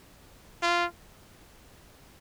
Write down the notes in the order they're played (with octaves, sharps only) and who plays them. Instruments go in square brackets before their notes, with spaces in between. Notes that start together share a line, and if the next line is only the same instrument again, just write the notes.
[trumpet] F4